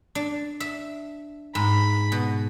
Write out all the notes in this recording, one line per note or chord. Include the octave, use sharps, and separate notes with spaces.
D4
E5
G#2 B5
B2